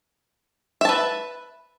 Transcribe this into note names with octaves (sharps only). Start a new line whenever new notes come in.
B4 E5 A5